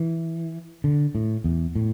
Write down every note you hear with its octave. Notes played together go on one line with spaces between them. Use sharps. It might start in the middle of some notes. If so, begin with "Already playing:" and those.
Already playing: E3
D3
A2
E2
A2